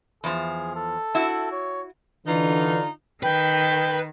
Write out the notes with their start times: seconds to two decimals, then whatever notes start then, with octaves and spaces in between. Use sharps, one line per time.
0.24 E2 F3 G#4
0.76 A4
1.15 E4 F#4
1.52 C#5
2.26 D3 E3 D4 D#4 F4
3.23 D#3 B4 G5